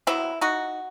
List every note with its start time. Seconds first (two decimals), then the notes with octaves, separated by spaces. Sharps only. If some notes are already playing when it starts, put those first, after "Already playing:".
0.07 C3 F#3 B3 C4 E4
0.41 D#4 F#4